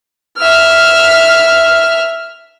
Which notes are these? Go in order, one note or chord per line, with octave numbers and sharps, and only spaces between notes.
E5 F6